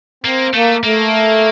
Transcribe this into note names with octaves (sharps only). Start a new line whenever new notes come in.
A#3 C4
A3 A#3
A3 A#3